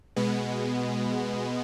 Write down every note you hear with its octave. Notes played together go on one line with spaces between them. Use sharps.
B2 G#3 B3